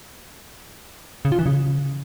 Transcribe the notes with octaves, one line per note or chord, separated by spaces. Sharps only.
C#3
F4
E3
C#3